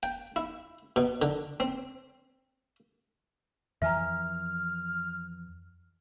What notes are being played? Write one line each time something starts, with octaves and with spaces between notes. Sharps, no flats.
G5
E4
B2
D3
C4
F2 E3 F3 E5 G#5 A#5 F6